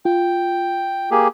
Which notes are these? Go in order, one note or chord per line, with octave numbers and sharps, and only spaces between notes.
F4 G5
A#3 G4 G#4